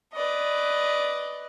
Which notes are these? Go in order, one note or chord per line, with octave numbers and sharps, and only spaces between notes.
B4 D5 D#5